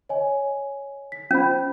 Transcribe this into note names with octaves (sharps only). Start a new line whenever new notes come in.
C#5 D#5 G#5
B6
C#4 F4 C5 B5